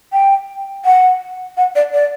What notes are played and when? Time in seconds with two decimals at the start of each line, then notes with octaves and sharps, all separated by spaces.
0.13 G5
0.85 F#5
1.57 F#5
1.76 D5
1.94 D5